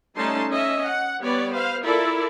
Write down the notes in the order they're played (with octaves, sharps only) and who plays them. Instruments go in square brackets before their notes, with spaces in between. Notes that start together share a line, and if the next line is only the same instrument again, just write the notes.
[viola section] G3 A3 C#4 D#4 A5 C6
C#4 D#5 E5
F#5
G3 B3 B4 C#5 D5
B4 C5 F5
E4 F4 A4 A#4 D5